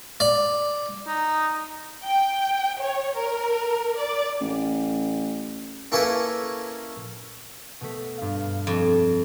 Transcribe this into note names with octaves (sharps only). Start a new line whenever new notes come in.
D5
D#4
G5
C#5
A#4
D5
A1
A#3 C#4 E4 A4 B4
B2 A3 B6
G2 F5
F2